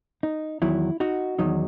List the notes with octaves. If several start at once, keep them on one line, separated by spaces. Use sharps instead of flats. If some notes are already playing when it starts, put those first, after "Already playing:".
D#4
E2 D#3 F#3 E4
D#4 F#4
E2 D#3 F#3 D#4